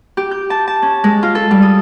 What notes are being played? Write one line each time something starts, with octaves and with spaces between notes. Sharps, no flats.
G4
G6
A5
A5
C#4
G#3
F4
A4
G3
D#6